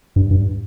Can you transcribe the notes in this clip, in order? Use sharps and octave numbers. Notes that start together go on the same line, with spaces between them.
G2
G2